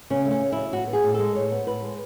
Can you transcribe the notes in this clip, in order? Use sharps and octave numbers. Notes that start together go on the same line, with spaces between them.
C#3 C#4
A3
C#4
C#3
F#3 E4
A2 F#4
B3
G#4
A2
A4
G#3
A2 C#5
B3
A2 B4
G#3